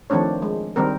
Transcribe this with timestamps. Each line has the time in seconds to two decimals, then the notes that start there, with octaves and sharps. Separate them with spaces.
0.10 D#3 F3 A3 C4 D4 C#5
0.42 G#3
0.76 D#3 G3 C4 A#4